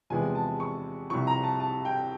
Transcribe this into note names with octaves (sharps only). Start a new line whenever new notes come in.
E2 C3 F3 G#3 B3 G#5
A5
C#6
C2 C3 F3 C#6
A#5
A5
A5
G5